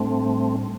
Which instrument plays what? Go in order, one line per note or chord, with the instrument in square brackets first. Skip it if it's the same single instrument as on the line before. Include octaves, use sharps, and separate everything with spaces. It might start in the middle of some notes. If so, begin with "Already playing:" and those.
Already playing: [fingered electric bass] A2 G3 D4 [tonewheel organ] A3 C4